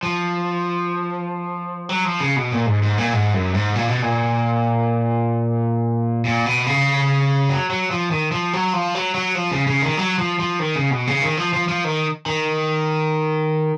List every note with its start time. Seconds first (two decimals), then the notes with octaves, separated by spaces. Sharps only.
0.03 F3
1.89 F#3
2.05 F3
2.20 C#3
2.36 B2
2.52 A#2
2.66 G#2
2.83 G#2
2.98 A#2
3.13 G#2
3.34 F#2
3.54 G#2
3.75 A#2
3.88 B2
4.02 A#2
6.25 A#2
6.46 B2
6.66 C#3
7.49 F#3
7.70 F#3
7.91 F3
8.11 D#3
8.32 F3
8.53 F#3
8.73 F3
8.95 F#3
9.15 F#3
9.35 F3
9.51 C#3
9.67 C#3
9.82 D#3
9.97 F#3
10.18 F3
10.39 F3
10.59 D#3
10.76 C#3
10.91 B2
11.07 C#3
11.22 D#3
11.37 F3
11.53 F3
11.68 F3
11.84 D#3
12.26 D#3